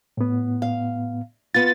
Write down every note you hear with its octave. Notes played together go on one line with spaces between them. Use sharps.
A2 B3
F5
B3 F4 A6